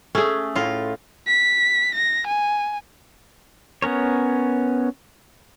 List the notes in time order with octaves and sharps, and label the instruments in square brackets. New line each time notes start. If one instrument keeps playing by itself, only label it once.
[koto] A3 [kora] C#4 G#4
[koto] A2 F4
[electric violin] B6
A#6
G#5
[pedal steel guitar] B3 C#4 A#4 C#5